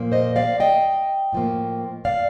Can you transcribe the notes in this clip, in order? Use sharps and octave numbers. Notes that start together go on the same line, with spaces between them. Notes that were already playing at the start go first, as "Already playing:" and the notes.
Already playing: A#2 F3 A#3
C5 D#5
D5 F5
D#5 G5
A2 F3 A#3
D5 F5